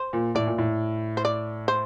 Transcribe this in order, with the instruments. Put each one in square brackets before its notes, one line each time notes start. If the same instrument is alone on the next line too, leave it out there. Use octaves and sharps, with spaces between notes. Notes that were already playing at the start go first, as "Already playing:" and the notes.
Already playing: [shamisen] C5
[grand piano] A#2
[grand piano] A2 [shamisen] D5
[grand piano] A#2
A2
[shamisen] C5
D5
C5